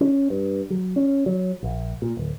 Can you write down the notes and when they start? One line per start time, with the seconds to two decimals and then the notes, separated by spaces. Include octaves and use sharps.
0.01 C#4
0.30 G2
0.70 F#3
0.96 C#4
1.26 F#3
1.63 A#1
2.02 A#2
2.17 D1